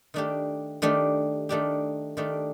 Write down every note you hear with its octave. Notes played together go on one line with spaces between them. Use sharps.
D#3 A3 D4 G4
D#3 A3 D4 G4
D#3 A3 D4 G4
D#3 A3 D4 G4